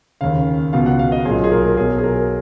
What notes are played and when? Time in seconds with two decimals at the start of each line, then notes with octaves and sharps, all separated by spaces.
0.21 D#2 C#3 F5
0.73 C#2 B2 F5
0.86 F#5
0.99 F5
1.12 D#5
1.25 B1 G#4
1.29 A#2
1.44 G#4
1.52 A#4
1.77 B1 B2 G#4
1.98 G#4
2.04 A#4